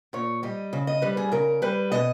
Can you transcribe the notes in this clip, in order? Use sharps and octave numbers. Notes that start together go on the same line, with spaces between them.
A#2 C#5
G3 D#5
C#3
D#5
G3 B4
G#4
C#3 A#4
G3 B4
B2 D#5